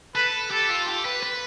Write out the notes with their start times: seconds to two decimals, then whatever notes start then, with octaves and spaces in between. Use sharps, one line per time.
0.15 A4 B4
0.51 G4 A4
0.69 F4
0.87 G4
1.05 B4
1.23 B4